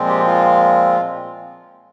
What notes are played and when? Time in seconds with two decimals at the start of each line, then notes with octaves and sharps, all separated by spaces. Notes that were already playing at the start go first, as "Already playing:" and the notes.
Already playing: A#2 F3 G#3 C4
0.09 G4
0.27 F4